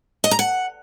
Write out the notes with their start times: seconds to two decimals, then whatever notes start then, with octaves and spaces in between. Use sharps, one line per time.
0.24 D#5
0.31 A#5
0.39 F#5